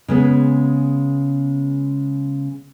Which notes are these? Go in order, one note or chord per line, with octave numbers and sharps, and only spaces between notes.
C#3 G#3 B3